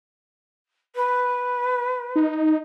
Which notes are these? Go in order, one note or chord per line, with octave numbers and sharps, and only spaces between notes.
B4
D#4